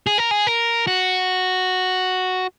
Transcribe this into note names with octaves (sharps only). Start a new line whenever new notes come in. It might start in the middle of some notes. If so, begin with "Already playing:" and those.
G#4
A#4
G#4
A#4
F#4